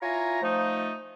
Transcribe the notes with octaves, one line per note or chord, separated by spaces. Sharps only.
E4 F4 C#5 G#5 A#5
F3 A3 D#4